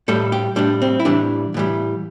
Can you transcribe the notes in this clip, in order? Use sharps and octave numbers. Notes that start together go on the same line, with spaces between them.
A2 G3 A4
G4
A2 G3 D4
C4
E4
A2 E3 G3 D4
A2 E3 G3